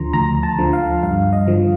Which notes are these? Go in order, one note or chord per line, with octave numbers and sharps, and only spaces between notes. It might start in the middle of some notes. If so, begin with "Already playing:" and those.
Already playing: D2 D3 F3 A#5 C6
D2 A#5
A5
D3 F3
F5
G2 F5
D#5
D3 F3